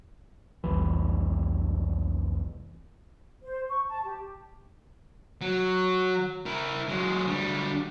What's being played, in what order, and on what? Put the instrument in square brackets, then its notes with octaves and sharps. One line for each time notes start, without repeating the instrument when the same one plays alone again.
[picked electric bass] F1 C2 E3
[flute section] C5
C#6
A5
G4
[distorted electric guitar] F#3
E4 A#4
F#3 G#3
D2 G3